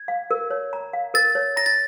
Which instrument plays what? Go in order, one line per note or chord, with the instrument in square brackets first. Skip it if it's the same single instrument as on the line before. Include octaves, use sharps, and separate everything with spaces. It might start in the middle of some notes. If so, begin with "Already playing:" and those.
Already playing: [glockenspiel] G#6
[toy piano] F5
A#4
C#5
A#5
F5
[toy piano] A#4 [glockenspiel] A6
[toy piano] C#5
[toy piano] A#5 [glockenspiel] A#6
[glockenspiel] A6